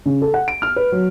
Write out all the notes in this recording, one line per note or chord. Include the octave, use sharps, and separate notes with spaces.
C#3
A4
F#5
D7
F6
B4
F#3